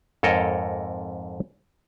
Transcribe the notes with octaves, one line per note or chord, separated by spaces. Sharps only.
F2 G#2 A4 A#4 C#5 D#5